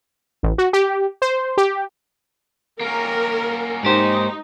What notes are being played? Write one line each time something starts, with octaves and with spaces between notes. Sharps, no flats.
A1
F#4
G4
C5
G4
A#3 C#4 A#4
G#2 D#4 G4 C5